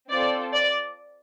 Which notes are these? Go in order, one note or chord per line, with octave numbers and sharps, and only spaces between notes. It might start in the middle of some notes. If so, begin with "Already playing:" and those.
C4 F4 A4 D5
D5